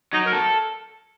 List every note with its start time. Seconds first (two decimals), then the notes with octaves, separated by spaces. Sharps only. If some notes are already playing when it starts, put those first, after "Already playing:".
0.13 F#3 D#4
0.26 A#4
0.33 A4